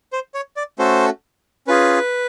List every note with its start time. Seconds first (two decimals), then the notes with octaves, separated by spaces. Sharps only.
0.13 C5
0.34 C#5
0.57 D5
0.79 A3 C#4 F#4 A4 C5
1.67 C#4 F4 G#4 B4